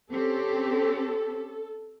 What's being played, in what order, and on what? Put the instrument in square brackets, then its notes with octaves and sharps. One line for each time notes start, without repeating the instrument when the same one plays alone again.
[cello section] C4 C#4 G4 [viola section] A4